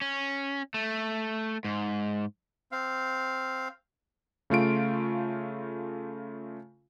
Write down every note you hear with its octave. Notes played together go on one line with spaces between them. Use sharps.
C#4
A3
G#2
C4 F5
C#3 A3 F4 D7